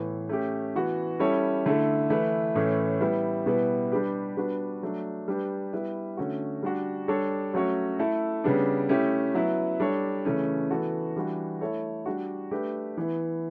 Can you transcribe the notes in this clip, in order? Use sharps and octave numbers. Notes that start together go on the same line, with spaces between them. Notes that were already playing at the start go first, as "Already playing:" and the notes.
Already playing: A2 E3 B3
A3 C#4 G4
E3 B3 F#4
G3 C#4 E4 A4 C#5
D3 A3 E4 A4
E3 A3 E4 B4
A2 E3 A3 C#4
G3 B3 E4
B2 G3 B3 E4 B4
G3 D4 G4 B4
G3 B3 D4 F#4 B4
F#3 A3 D4
G3 D4 G4 B4
G3 B3 E4 B4
D3 A3 C#4 F#4
G3 D4 F#4
G3 D4 A4 C#5
F#3 A3 C#4 F#4 C#5
A3 E4 A4
C#3 G3 B3 D4
A3 C#4 E4 G4
F#3 B3 E4 B4
G3 D4 A4 C#5
C#3 E3 A3 C#4
E3 B3 F#4 A4
E3 G3 D4 F#4
A3 E4 A4 C#5
G3 D4 F#4
A3 D4 G4 B4
E3 B3 E4